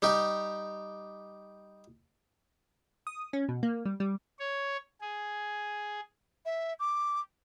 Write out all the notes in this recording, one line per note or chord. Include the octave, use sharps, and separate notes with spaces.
G3 D#4 G4
D#6
C#4
B2
A#3
G3
G3
C#5
G#4
E5
D6